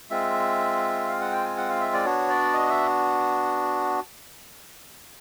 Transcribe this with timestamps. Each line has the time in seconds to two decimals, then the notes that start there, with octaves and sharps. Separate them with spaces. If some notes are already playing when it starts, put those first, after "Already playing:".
0.10 G#3 C4 F4 E5
1.08 F5
1.20 F#5
1.32 G5
1.45 G#5
1.57 F#5
1.69 F5
1.81 E5
1.93 D5
2.05 B3 D4 F#4 C#5
2.30 D5
2.53 D#5
2.70 E5